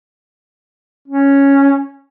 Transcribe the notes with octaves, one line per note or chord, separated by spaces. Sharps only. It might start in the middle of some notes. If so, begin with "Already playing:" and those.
C#4